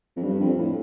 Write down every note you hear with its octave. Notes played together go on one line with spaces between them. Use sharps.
F2
G2
F2
A2